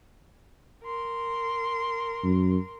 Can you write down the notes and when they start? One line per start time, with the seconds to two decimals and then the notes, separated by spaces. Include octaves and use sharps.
0.84 A#4 C6
2.24 F#2